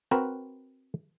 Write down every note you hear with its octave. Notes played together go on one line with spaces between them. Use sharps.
C4 F#4 A#4 B4